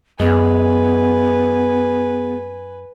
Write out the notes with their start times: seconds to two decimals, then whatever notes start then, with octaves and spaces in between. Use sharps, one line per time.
0.20 F#2 G#3 B3 B4 G#5